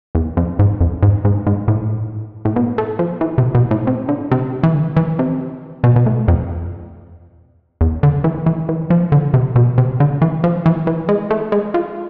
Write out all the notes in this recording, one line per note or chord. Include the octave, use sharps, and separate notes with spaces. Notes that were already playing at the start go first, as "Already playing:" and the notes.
E2
F2
G#2
F2
G#2
G#2
G#2
A2
A2
B2
A3
F3
E3
C3
B2
A2
C3
D3
C3
E3
D3
E3
C3
B2
B2
A2
F2
E2
D3
E3
E3
E3
F3
D3
C3
B2
C3
D3
E3
F3
E3
E3
G#3
A3
G#3
F3